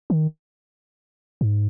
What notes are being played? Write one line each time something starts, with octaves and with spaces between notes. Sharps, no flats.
D#3
G#2